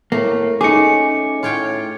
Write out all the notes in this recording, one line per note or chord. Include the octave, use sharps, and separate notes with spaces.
A2 A3 A#3
A3 C#4 D#4 G#4 D6 C#7
A2 F4 C#5 G5